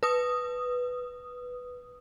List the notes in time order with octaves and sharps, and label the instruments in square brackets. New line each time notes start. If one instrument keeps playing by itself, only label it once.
[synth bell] B4 D#6